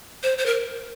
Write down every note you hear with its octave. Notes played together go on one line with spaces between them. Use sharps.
C5
C5
A#4